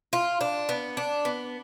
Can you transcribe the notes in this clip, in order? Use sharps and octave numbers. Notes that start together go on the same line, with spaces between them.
F4
D4
B3
D4
B3